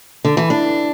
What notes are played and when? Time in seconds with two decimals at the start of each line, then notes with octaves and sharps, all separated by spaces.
0.25 D3
0.37 E3
0.50 D4